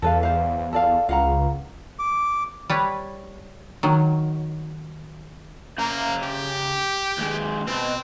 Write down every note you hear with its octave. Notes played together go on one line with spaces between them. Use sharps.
E2 A4 B4 F5
C5 F5
A4 D5 F5
C#2 F5 F#5 A#5
D6
G3 B4 C#5
D#3 F#3
C#3 A#3 A#5
G4
D#2 G#3
B2 C4